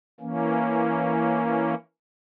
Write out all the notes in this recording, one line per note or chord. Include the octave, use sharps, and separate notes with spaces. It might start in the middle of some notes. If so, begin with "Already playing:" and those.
E3 A#3 C#4